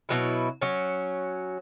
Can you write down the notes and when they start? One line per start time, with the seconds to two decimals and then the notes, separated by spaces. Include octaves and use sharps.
0.09 B2 F#3 E4
0.62 F#3 C#4